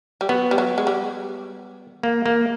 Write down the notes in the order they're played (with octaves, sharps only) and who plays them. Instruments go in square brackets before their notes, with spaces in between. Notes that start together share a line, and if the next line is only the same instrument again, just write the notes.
[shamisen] G3
[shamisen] F#3 [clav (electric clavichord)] B3
[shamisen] G3
F#3
G#3
G3
[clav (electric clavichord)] A#3
A#3